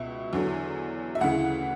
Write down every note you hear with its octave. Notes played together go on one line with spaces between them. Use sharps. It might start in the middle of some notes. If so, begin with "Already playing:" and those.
Already playing: C#2 B2 E5
E2 D3 F#3
E5
D2 C#3 E3 F#5